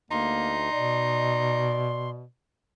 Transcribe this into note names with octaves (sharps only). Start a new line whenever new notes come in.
D2 A#3 D#4 C6
B2 D5